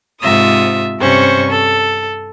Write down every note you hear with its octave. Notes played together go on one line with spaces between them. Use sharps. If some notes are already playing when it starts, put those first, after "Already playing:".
G#2 C3 F4 E5 D#6
G2 C3 C#4 C5 C#6
A4